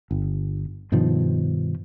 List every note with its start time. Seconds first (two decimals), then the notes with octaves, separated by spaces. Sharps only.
0.11 G1
0.92 G2 B2 D#3 F3